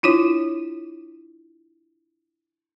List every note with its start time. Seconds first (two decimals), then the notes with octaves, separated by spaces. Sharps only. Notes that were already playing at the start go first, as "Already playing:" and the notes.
0.03 D4 E4 F4 C#5